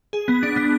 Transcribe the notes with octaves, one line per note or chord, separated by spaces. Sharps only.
G#4
B3
D4
B3